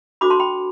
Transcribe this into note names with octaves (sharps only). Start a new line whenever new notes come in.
D4 F#4 A4 C5 B5 D6
A5 C6
G5 B5